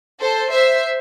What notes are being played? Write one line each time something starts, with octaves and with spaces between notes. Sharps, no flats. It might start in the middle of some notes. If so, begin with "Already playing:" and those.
A4 C5
C5 E5